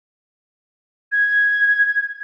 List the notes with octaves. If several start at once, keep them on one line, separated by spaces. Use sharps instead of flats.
G#6